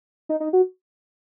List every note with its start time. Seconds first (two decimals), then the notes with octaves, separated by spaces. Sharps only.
0.29 D#4
0.40 D#4
0.53 F#4